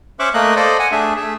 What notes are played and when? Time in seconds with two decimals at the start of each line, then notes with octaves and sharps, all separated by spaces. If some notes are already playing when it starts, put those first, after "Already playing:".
0.19 C#4 C5 E5 C#6 D6 F#6
0.34 A3 A#3 D#5 F#6
0.56 A4 C5 D5 D#5
0.79 F#5 G#5
0.92 A3 D4 G#4 E5
1.16 A3 G#4 E5